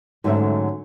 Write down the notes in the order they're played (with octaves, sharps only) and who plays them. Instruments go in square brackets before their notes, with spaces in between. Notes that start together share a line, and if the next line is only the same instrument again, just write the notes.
[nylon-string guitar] G#2 D3 F#3 A3 C#4 E5